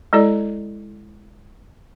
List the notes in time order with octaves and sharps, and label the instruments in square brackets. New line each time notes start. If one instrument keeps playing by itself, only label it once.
[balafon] G#3 E4 A4 D5